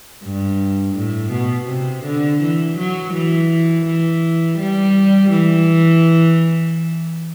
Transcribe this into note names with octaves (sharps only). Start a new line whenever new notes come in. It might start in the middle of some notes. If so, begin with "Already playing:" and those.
G2
A2
B2
C3
D3
E3
F#3
E3
E3
G3
E3